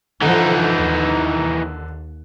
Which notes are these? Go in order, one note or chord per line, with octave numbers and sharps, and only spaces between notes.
D3 E3 F3 D#4
D#2